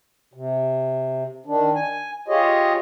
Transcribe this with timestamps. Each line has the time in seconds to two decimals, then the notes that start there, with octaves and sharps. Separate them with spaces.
0.33 C3
1.46 D#3 D4
1.75 G#5
2.28 F4 G4 G#4 C#5 D#5